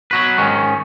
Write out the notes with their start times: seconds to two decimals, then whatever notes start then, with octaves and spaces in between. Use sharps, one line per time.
0.11 F#3 F#4 B4
0.38 G#2 D#3 C#4